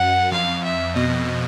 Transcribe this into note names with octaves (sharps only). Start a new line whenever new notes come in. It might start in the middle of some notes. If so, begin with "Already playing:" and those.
Already playing: F#2 F#5
F2 F5
E5
B2 D#5